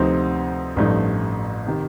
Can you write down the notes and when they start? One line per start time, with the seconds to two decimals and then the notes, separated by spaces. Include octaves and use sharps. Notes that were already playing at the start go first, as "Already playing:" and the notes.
Already playing: D2 C3 F3 C4 D#4
0.76 A1 G2 F3 A3 D#4
1.67 C3 D#3